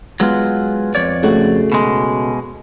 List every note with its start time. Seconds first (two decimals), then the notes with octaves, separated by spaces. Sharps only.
0.20 F#3 G#3 B3 F4
0.95 F2 C#5 D5
1.23 C#3 A3 F#4
1.72 B2 G#3